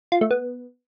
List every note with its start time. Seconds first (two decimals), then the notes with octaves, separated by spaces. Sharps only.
0.12 F4
0.21 A3
0.31 B3